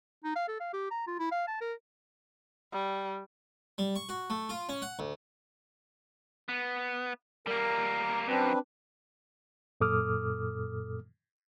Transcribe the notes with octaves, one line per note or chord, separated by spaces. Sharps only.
D#4
F5
A4
F5
G4
A#5
F4
E4
F5
A5
A#4
G3
G3
C#6
F#4
A3
F4
C#4
F#5
D2
B3
G3 A#3 A#4
F#2 C4 D4 B4
F#2 A#2 A4 D6 D#6 F6